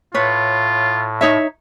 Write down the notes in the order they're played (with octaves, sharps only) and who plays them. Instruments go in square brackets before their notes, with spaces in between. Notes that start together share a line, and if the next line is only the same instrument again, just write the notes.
[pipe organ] A2 [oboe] F4 [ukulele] B4 C#5
[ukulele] D#4 C#5 E5